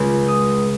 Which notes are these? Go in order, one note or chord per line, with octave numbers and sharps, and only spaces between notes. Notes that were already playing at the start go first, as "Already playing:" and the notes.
Already playing: C#2 C#3 G#3
D#6